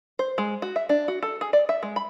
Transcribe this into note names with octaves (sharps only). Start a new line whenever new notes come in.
C5
G#3
F#4
E5
D4
F#4
A4
G#4
D5
E5
G#3
B5